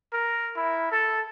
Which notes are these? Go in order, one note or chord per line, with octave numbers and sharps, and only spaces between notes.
A#4
E4
A4